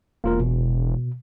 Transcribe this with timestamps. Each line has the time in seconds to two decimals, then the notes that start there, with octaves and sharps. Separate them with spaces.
0.24 E1 A#3 F4 A#4
0.40 B2